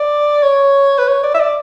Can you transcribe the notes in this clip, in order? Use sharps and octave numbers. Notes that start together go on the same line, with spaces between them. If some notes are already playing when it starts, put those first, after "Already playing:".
Already playing: D5
C#5
B4
C#5
D5
E5
D5